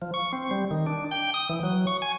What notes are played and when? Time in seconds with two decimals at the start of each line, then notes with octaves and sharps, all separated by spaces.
0.02 F3
0.14 C#6
0.33 C4
0.51 G3
0.71 D#3
0.87 D4
1.11 G5
1.34 D#6
1.49 E3
1.63 F#3
1.87 C#6
2.02 G#5